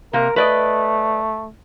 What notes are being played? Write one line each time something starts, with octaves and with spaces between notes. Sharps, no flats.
C3 A#3 A#4
A3 B4 D5 D#5